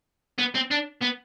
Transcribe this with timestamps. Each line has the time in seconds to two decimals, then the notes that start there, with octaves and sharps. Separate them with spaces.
0.38 B3
0.55 C4
0.71 D4
1.02 B3